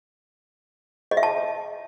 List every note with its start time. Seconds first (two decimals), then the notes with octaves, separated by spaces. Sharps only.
1.11 D#5
1.17 E5
1.23 A5